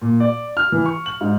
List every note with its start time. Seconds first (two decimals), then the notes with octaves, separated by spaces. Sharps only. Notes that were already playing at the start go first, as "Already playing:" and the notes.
0.02 A#2
0.20 D5
0.57 F6
0.72 E3
0.86 C#6
1.06 F#7
1.21 G#2